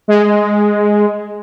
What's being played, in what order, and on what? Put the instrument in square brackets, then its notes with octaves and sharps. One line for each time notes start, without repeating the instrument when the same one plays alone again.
[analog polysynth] G#3